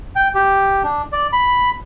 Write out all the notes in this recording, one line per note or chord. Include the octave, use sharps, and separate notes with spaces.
G5
G4
D4
D5
B5